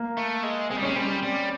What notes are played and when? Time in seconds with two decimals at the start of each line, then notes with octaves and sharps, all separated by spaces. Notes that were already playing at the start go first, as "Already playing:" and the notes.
Already playing: A#3
0.17 A3
0.43 G#3
0.70 G#3 C4
0.78 G3
0.82 G#3 C#4
0.95 G3 C4
1.23 G3